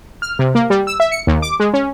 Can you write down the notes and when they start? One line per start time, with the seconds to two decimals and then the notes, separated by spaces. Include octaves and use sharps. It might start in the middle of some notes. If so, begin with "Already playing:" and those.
0.22 F6
0.39 C3
0.55 A#3
0.70 G3
0.87 E6
1.00 E5
1.12 C#7
1.27 D#2
1.42 D6
1.60 G#3
1.74 C#4